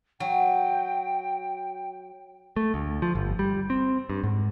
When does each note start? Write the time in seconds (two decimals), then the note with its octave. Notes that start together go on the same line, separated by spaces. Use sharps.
0.20 F#3 G5
2.57 A3
2.74 D2
3.02 F3
3.15 G1
3.39 G3
3.70 C4
4.10 G2
4.24 G#2